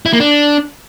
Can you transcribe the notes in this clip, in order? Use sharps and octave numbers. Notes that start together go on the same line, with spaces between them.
E4
A#3
D4